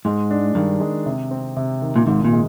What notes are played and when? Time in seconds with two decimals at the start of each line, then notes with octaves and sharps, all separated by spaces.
0.05 G#2 G#3
0.30 D4
0.55 G2 D#3
0.80 G#3
1.06 C3
1.31 C4
1.57 C3
1.82 D#3
1.96 A#2
2.07 G#1 G#2
2.24 A#2
2.33 G#3